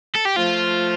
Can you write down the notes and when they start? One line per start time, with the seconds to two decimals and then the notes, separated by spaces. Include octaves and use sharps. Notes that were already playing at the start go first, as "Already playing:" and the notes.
0.15 A4
0.25 G4
0.36 F3 A3 F4